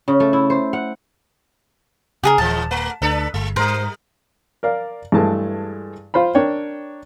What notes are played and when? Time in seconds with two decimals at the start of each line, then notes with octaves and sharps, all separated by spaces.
0.08 C#3
0.20 A3
0.33 E4
0.50 C5
0.73 F#5
2.23 C#3 G4 G#4 A#4
2.38 D#1 A#2 E3 G#3 A5
2.71 A3 B4
3.02 D2 D4 A4 B4
3.34 G1 G#3
3.56 G#2 G3 A#4 C5
4.63 A#4 D5 F5
5.12 G2 E3 G#3 A3 A5
6.14 F4 C5 F5 B5
6.35 D4 A#4 C#5 G5